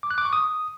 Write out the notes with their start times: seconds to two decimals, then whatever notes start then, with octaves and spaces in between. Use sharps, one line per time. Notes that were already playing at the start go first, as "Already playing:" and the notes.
0.03 D6
0.11 F#6
0.18 D6
0.25 C#6
0.33 D#6